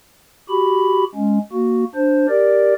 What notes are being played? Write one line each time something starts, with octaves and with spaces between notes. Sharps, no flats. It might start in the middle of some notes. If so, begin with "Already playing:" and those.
F#4 G4 B5
G#3 C#4
A#3 F#4
D4 C5
G4 A#4 D5